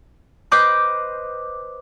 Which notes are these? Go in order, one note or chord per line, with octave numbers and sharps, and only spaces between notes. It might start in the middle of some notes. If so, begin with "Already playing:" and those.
B4 C5 D#5 D6 F#6 G6